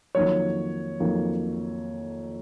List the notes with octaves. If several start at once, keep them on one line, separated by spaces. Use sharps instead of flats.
F2 D#3 F#3 A#3 C#5
F2 D#3 F#3 A#3